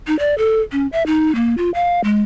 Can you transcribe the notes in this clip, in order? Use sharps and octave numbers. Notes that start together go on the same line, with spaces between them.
D#4
D5
A4
C#4
E5
D#4
A#3
F4
F5
G#3